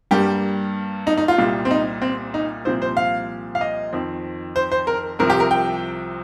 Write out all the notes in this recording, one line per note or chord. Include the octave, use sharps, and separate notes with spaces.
G2 G3 A#3 G4
D#4
D#4
F4
C2 A#2 G3
C4
D#4
C4
D#4
C2 A#2 F3 C4 C5
C5
F5
F5
D#5
F2 D#3 C4
C5
C5
A#4
C2 C3 F3 C4 A#4
G4
A#4
G5